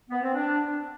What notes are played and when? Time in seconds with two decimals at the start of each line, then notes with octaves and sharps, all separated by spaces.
0.10 B3
0.22 C4
0.34 D4